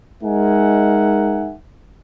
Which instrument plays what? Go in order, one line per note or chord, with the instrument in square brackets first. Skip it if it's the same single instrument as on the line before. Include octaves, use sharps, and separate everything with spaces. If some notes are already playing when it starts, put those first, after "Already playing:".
[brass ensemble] G#3 D#4 A#4 E5 F#5 G#5